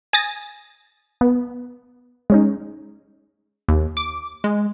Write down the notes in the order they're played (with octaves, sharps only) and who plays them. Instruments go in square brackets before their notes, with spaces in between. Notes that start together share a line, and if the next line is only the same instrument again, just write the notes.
[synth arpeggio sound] G#5 D#6 A6 A#6
B3
G#3 C#4 D#4
[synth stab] D#2
D6
G#3